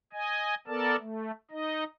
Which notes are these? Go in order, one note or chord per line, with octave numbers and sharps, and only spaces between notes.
D#5 G#5
B3 A4 A#4 D5 A5
A3
D#4 D#5